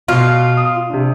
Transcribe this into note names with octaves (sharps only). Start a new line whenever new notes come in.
B2 F4
D#6
C3 D4